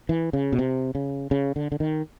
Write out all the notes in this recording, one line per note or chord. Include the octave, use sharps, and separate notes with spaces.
E3
C#3
B2
C3
C#3
C#3
D3
D3
D#3